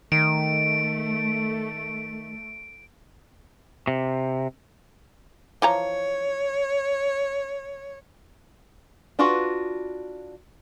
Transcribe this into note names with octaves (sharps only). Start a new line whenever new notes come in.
D#3 A3 D7
C3
E3 F3 C#5 A#5
D4 F4 F#4 B4